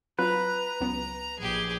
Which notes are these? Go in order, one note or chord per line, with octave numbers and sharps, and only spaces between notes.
F#3 C4 F4 B4 A#5
C#2 F#3 B3
A#1 G4 G#4